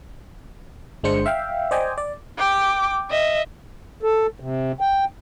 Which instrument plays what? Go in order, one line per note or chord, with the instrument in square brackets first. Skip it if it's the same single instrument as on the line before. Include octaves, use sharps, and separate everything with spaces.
[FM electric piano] G1 G#3 D4 C5 C#7
E5 F5 G5
C5 D5 D#5 G5 G#5
D5
[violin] G5 D6
D#5 E5
[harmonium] A4
C3
G5